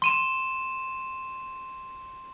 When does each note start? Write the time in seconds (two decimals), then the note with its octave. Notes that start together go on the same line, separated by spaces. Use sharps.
0.02 C6 D#7 E7